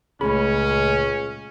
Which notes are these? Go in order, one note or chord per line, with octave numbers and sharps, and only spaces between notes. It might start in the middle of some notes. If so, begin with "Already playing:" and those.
C#2 A#2 A3 C#4 G#4 B5